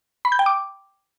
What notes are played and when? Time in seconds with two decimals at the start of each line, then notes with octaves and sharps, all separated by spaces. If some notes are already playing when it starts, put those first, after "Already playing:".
0.25 B5
0.32 G6
0.39 G5
0.46 D6